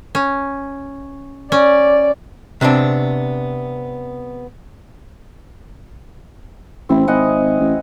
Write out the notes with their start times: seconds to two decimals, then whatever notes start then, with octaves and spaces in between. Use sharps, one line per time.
0.15 C#4
1.52 C#4 D5
2.61 C3 B3 C4 D4
6.89 A1 C4 E4
7.08 G#1 D#5 F#5 G#5
7.60 A1